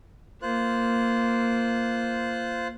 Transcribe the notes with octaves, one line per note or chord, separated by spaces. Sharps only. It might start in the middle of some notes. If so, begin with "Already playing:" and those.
A#3 F4 C5 F#6